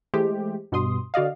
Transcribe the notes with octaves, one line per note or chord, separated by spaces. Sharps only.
E3 G#3 A3 G4 C5
G2 B2 C6 D#6
D3 F#4 D5 D#5 F5